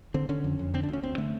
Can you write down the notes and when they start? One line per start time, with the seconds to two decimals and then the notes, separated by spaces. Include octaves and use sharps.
0.14 D3 C4
0.29 D3 C#4
0.44 F2
0.59 F2
0.74 D3 C4
0.83 D4
0.89 D2 C#4
1.03 D2 C4
1.18 D3 A3